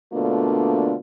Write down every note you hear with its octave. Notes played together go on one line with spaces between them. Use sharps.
B2 D3 A3 A#3 D4 F4